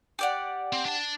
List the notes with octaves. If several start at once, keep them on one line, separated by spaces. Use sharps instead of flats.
G4 D5 F#5
C4
D4 A5